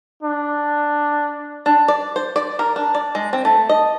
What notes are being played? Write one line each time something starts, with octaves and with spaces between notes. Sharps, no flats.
D4
D4
D5
C5
D5
A#4
D4
D5
G#3
C4
A3
D#5